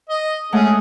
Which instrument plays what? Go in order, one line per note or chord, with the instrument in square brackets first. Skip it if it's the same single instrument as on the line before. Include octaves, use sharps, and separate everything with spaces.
[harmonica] D#5
[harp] G#3 A3 F#5 [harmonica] C#4 G#4 D#6